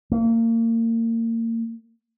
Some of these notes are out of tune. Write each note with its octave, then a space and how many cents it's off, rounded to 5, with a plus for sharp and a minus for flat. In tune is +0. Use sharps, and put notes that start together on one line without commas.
A#3 -30